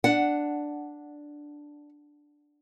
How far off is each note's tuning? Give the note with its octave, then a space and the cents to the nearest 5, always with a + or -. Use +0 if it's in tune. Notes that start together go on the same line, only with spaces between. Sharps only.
D4 +0 D5 +0 F#5 +0